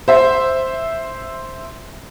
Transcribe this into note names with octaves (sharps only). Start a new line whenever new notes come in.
C5 E5